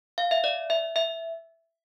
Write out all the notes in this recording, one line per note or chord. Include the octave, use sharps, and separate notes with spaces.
F5
E5
D5
E5
E5